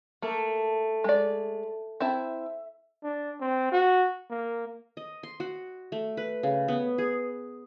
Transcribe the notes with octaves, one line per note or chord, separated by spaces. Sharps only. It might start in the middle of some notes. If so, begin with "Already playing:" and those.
A3 A#3
G#3 D5
C4 E4 E5 A5
D4
C4
F#4
A#3
D#5
C6
F#4
A3
B4
C#3
B3
G#4